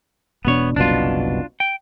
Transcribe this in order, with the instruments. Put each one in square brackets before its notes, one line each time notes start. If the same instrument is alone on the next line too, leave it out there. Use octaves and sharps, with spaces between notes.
[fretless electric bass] E1 B2 D4 [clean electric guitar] B3 C#5
[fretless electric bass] F#1 C2 B2 [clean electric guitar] D4 F4
[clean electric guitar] G5